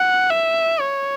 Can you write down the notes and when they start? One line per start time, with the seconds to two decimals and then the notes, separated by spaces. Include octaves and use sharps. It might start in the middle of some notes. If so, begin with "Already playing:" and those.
Already playing: F#5
0.31 E5
0.80 C#5